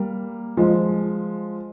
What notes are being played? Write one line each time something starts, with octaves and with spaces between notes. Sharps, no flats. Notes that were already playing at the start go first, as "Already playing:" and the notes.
Already playing: G3 A#3
F3 G#3